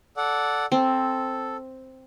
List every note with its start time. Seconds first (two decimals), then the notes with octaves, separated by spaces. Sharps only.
0.17 A4 D5 F#5
0.72 C4 A4